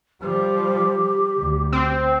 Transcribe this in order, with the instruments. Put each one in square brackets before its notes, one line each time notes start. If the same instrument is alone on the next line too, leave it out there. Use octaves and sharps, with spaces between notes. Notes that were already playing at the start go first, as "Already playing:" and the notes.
[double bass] F3 G3 [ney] G4
[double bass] D2
[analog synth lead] C4